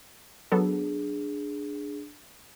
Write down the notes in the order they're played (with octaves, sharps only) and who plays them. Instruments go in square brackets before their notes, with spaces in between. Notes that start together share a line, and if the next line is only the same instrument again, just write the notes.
[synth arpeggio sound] F#3 B3 A4 [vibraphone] D4 G#4